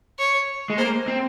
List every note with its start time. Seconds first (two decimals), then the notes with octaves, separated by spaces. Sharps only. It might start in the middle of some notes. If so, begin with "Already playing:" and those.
0.19 C#5
0.70 G#3
0.78 A#3 C5
1.08 C4